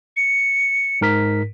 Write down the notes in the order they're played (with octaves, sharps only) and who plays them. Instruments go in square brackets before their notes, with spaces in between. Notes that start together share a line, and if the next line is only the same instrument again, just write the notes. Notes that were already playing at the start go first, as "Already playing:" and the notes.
[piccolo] C#7
[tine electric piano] G#2 A#4 B6